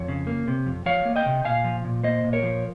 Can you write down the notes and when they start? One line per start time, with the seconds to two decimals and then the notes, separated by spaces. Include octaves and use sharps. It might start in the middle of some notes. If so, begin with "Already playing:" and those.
Already playing: F2 C#5
0.08 C#3
0.27 A#3
0.48 C3
0.66 F2
0.86 F3 C#5 F5
1.05 A#3
1.16 D#5 G5
1.26 C3
1.45 A#2 F5 G#5
1.64 F3
1.85 A#2
2.03 A#3 C5 D#5
2.24 A#2
2.33 A#4 C#5
2.43 F3